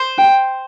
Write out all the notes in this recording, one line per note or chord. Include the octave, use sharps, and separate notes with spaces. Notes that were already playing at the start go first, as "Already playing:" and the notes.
Already playing: C5
G5